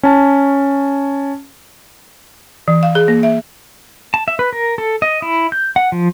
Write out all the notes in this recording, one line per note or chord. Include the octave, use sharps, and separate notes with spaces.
C#4 A5
E3
F5
G#4
A#3
E5
A5
E5
B4
A#4
A4
D#5
E4
G6
F#5
F3